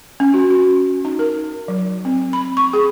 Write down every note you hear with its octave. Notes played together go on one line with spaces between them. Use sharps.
C#4
F#4
F#4
D#4
A#4
F#3
C4
B5
C#6
G#4